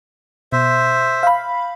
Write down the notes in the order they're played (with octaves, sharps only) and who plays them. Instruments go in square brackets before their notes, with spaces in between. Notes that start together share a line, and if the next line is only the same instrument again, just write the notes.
[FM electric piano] B2 [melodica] C5 E5
[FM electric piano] F5 B5